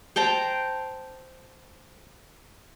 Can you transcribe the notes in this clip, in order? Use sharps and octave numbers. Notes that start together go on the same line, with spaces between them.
C5 G5 A5 A#5